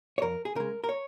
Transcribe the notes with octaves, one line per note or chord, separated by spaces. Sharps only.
C#5
F2 A#4
G#4
C#3 G#3 A#4
A#4
C#5